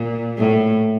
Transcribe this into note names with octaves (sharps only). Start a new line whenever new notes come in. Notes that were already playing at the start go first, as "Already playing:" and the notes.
Already playing: A#2
A2